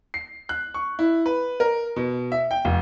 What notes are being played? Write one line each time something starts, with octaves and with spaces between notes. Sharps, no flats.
C7
F#6
C#6
E4
B4
A#4
B2
E5
G5
F1